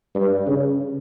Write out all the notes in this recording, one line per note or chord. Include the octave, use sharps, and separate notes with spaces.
G2
C#3